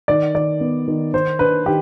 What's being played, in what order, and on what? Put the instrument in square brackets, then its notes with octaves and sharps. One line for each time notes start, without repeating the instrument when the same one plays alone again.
[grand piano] D#3 [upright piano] D5
[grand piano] D#3 [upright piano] D5
[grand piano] B3
D#3
[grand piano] D#3 [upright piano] C5
[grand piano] D4 [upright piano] B4
[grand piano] D#3 [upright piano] G4